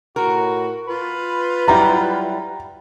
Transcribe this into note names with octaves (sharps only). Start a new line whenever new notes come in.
A2 F#4 A#4
F4 B4
F#3 G3 E4 A#5